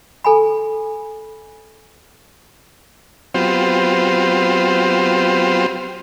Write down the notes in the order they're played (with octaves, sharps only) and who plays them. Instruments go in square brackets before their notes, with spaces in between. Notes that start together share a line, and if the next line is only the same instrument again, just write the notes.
[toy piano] A4 G#5 B5
[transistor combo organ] F#3 B3 C4 F4 G4 C5